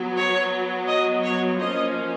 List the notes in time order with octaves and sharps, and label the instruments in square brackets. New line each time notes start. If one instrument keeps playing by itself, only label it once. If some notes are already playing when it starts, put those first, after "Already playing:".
Already playing: [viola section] F#3 B3
C#5
D#5
C#5
F3 A#3 C#4 D#5